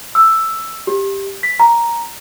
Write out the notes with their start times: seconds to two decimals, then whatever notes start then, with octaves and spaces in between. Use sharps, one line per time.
0.15 E6
0.87 G4
1.43 B6
1.60 A#5